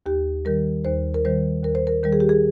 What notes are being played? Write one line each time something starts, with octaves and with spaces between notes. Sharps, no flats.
D#2 G4
D#3 G3 A#4
D#2 C5
A#4
D#3 G3 C5
D#2 A#4
C5
A#4
D#3 G3 A#4
G#4
G4
G#4